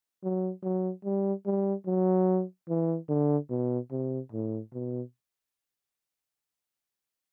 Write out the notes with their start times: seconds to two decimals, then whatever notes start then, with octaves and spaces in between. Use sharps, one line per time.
0.23 F#3
0.63 F#3
1.04 G3
1.45 G3
1.86 F#3
2.68 E3
3.09 D3
3.50 B2
3.91 C3
4.32 A2
4.73 B2